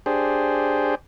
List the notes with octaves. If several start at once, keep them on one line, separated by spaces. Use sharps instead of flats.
D4 G4 G#4 C5